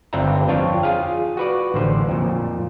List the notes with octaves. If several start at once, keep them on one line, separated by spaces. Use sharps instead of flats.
G1 G2 C4 D4 E5 A#5
F2 C4 D4 F4 C#5 G5
F4 G#4 F5
F#4 B4 D5
A1 D3 C5
F2 A#2